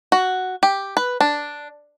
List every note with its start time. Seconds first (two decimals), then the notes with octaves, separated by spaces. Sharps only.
0.12 F#4
0.63 G4
0.97 B4
1.20 D4